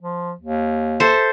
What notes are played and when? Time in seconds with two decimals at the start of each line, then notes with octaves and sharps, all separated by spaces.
0.02 F3
0.41 D#2
1.00 A4 C5 E5